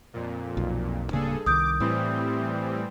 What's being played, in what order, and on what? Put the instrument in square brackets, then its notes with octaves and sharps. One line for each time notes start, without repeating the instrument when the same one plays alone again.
[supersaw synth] F2 A#2
[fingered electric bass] B1
[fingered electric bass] D1 C#3 A#3 [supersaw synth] G2 G#4 A4
[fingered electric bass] C2 D#3 [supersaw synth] D6 [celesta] D#6 G6
[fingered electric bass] A2 [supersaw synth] E3 G3 C4